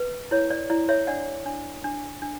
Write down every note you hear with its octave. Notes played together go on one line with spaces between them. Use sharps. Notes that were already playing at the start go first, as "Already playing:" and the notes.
Already playing: B4
E4 C#5
D5
E4 D5
C#5 E5
D4 D5 F#5
D4
D4
D4